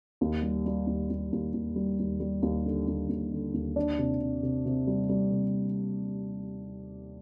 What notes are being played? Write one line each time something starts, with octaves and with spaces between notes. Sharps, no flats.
D#2
G3
G3
D#2
D#2
D#2
D#2
G3
D#2
G3
D#2
D3
D#2
D#2
D3
D#2
D4
C3
C3
C3
C3
G3
G3
C3